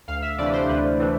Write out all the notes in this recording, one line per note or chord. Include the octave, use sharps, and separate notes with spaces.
D2 F5
E5
C3 E3 A3 D4 D5
B4
C5
D2 B4
C3 E3 A3 D4